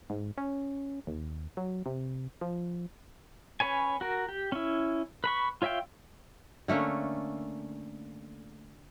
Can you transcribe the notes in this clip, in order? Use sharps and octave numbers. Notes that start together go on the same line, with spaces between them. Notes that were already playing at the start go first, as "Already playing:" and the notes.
G#2
C#4
D#2
F#3
C3
F3
C#4 B4 C#5 G#5
F#4 A#4
G4
C#4 E4
B4 B5 C#6
F4 C#5 E5 F5 G5
D3 A3 A#3 C#4